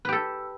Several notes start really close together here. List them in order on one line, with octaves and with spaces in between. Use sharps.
B4 G4 A4